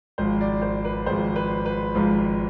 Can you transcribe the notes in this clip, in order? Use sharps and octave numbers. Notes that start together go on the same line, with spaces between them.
G#1 G#2 F3 C5
D5
C5
B4
G#1 G#2 F3 C5
B4
B4
G#1 G#2 F3